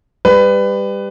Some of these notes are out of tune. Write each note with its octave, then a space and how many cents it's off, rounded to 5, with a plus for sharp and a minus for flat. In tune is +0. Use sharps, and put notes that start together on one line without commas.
G3 +20 B4 +20